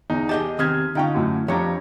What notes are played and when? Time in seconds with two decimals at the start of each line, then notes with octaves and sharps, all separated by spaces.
0.10 E2 D#4
0.29 G4 G#4 D#5 A5 G6
0.59 D#3 C4 G4 D#6 F6 G#6
0.95 D3 C#4 D#4 F4 G5
1.14 F#2 A2
1.48 F2 F3 D4 G4 C#5 A#5